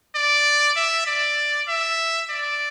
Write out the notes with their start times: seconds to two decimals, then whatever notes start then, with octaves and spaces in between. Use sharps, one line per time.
0.15 D5
0.76 E5
1.07 D5
1.68 E5
2.30 D5